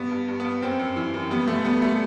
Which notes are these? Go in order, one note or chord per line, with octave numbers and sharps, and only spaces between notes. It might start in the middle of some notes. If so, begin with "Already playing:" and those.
Already playing: G2 B3
G2
G2
G2 B3
F#2 C4
F#2
E3
F#2
G3 B3
B2 A3
G3 B3
G3 A3